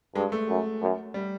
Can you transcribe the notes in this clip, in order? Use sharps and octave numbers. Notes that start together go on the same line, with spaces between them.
G2 G#3
A3
F#2
F#2
G3